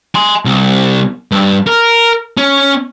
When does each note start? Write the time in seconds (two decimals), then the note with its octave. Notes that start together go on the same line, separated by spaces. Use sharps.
0.15 G#5 C6
0.45 C2
1.32 G2
1.67 A#4
2.37 C#4